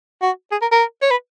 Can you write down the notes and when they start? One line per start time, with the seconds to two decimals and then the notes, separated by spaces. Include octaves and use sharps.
0.22 F#4
0.51 G#4
0.61 A#4
0.72 A#4
1.02 C#5
1.11 B4